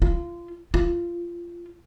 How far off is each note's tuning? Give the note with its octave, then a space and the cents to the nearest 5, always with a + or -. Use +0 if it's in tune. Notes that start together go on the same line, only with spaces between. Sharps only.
F4 -25
F4 -20